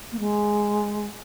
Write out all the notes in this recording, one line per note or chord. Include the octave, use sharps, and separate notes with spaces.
A#3
G#3